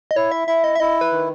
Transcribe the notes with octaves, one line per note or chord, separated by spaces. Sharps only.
D#5
E4 C#5
E5
E4 E5
D#5
E5
E4 D#5
B4
D#3